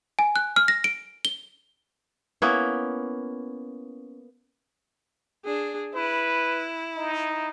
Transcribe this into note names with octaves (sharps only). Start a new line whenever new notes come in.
G#5
F#6
F6
A#6
D7
G7
A#3 B3 C#4 E4
D4 G#4
E4 B4
D#4